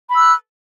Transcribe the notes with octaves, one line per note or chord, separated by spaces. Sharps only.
B5 E6 F#6